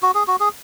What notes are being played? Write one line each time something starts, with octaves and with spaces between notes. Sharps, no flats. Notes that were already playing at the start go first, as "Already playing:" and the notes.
F#4
G#4
F#4
G#4